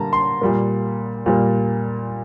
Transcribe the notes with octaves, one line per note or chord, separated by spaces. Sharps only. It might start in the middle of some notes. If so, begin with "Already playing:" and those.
Already playing: D3 G3 A#3 A5 A#5
C6
A#2 G3 A#3
A#2 G3 A#3